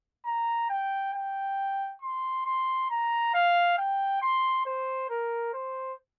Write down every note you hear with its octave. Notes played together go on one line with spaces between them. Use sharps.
A#5
G5
G5
C6
C6
A#5
F5
G5
C6
C5
A#4
C5